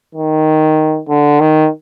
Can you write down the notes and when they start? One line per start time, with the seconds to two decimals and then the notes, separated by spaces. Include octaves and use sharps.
0.15 D#3
1.09 D3
1.40 D#3